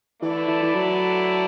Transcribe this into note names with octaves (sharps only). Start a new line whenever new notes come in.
D3 E3 A3 E4 B4 D5
E3
E3
F#3